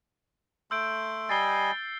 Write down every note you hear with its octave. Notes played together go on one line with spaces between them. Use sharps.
A3 C6 E6 G6 D7
G3 D#5 G#5 A6 C7 G7